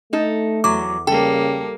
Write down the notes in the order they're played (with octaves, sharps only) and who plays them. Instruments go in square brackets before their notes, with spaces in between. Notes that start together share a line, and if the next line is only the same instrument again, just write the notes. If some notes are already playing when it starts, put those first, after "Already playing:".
[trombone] A3 [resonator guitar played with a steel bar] D#4 A4
[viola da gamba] E2 [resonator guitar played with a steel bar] F#3 [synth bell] D6
[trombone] C#3 [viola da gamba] G3 A#3 [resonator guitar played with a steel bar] A4 [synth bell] G5